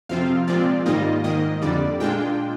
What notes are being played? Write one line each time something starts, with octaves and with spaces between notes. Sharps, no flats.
F2 C3 F3 C4 F4 F5
A#2 F3 G#3 C4 F4 D5
G#2 D#3 G3 A#3 F4 D#5
G#2 D#3 A#3 D#5
F2 D3 G3 D5
A#2 G#3 D4 F4 G5